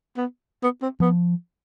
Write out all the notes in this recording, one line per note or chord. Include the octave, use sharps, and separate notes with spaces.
B3
B3
C4
F3 B3